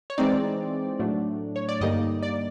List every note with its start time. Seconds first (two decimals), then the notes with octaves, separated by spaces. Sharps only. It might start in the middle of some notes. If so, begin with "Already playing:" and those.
0.10 C#5
0.18 E3 G#3 C4 D#4 D5
0.99 A2 F#3 A3 D4
1.56 C#5
1.69 D5
1.81 G2 D3 G3 A#3 D#4 D#5
2.23 D5